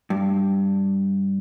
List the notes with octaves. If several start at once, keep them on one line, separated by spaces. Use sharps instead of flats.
G2